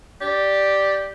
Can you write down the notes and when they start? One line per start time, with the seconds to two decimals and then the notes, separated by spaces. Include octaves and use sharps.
0.21 G4 D5